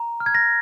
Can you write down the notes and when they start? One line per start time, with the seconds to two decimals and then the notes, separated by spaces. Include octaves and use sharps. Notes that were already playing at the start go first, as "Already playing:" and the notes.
Already playing: A#5
0.20 F6
0.26 G#6
0.35 A#6